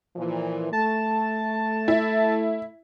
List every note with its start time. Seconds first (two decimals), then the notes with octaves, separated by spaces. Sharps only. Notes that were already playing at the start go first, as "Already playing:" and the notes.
0.16 A#2 E3 F3
0.73 A3 A5
1.88 E4